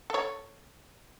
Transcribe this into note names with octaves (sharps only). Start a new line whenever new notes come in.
A4 C#5